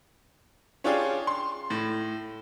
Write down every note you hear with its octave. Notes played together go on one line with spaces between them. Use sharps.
C#4 D4 F4 G4 G#4
C6
A2